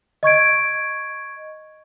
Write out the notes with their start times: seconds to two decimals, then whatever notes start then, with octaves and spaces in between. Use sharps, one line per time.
0.23 D#5 C#6 G#6 D7